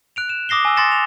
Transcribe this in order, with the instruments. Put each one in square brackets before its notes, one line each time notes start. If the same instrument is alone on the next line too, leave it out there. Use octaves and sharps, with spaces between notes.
[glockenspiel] F#6 D7 F7
E7
D6 D#6 A#6 C7 G7
G#5 E6
C6 D#6 A6 A#6 C#7 E7
F7